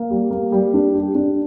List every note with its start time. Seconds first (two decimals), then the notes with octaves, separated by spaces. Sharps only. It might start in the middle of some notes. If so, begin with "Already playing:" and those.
Already playing: A#3
0.11 G3
0.31 A#3
0.52 G3
0.74 D4
0.95 G4
1.15 D4